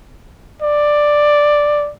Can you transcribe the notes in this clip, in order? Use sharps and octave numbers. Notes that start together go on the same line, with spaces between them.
D5